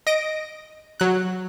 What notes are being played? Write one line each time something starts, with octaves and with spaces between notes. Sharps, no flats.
D#5 A#6 D7
F#3 F#6